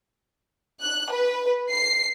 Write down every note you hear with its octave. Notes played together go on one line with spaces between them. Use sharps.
F#6
B4
C7